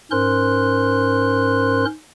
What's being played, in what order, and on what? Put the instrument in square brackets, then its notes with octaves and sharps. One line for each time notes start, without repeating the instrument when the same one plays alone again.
[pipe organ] G#2 C#4 A#4 C5 C6 F#6